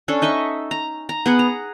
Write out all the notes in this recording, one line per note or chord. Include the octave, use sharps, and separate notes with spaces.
C#4 D4 A4
D#4 D#5 E5 C#6
A#5
A#5
B3 G#4 F#5
A#5